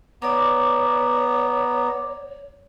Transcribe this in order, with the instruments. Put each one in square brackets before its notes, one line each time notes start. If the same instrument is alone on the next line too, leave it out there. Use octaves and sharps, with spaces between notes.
[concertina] B3 A#5 [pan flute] C#5 [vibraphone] D5 D6